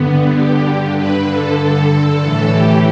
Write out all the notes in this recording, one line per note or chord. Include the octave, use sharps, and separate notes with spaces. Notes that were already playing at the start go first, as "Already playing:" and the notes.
Already playing: G2 D3 B3
G4
G2 D3 B4
A4
A4
A4
A2 E3 A4
G4